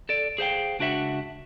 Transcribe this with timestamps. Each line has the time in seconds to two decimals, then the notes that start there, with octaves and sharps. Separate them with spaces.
0.09 A4 D5
0.38 G#4 C5 F5 G5
0.79 C#2 D4 F#4 E5 F#5